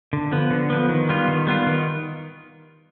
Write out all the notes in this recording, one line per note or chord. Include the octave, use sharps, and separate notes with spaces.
D3
F3 B3
D3
F3 B3
D#3
G3 B3 F4
D#3
G3 B3 F4
D#3